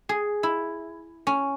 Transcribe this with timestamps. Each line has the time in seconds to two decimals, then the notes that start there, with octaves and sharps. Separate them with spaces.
0.09 G#4
0.43 E4
1.27 C#4